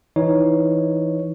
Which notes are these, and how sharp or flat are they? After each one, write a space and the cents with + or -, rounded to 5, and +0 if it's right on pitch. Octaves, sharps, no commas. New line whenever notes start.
E3 +0 D#4 +10 C#5 +0